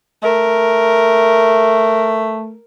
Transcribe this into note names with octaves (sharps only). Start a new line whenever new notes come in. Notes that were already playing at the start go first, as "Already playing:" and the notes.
A3 A#4